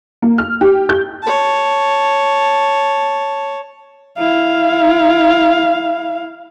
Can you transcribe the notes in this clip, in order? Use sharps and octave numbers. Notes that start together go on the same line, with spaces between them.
A#3
F6
G4
G6
C#5 A5
E4 F5